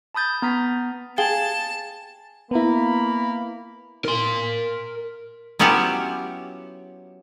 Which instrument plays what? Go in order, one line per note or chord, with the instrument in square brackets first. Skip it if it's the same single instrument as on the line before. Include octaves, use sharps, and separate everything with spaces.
[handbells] A5 B5 D#6 G6 A6
B3 A#5 D#6 B6
[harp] G#4 [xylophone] F5 G5 G7 [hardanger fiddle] A5
[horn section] A#3 B5 [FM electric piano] B3 E4
[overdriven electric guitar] A#4 C6
[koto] F#3 B3 C#4 E4 F4 G4